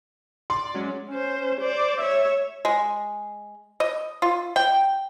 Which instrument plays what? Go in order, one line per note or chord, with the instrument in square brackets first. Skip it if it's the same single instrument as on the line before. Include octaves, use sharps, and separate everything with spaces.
[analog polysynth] D5 [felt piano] C6
[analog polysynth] F#3 G#3 C#4
[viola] C#4 C5
C5 D5
C#5 E5
[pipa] G#3
D#5
F4
G5